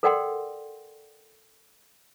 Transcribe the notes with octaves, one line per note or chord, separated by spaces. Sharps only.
A4 A#4 D5 F#5 G5 C6